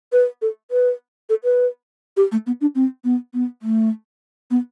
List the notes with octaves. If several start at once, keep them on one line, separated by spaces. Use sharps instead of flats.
B4
A4
B4
A4
B4
G4
A3
B3
D4
C4
B3
B3
A3
B3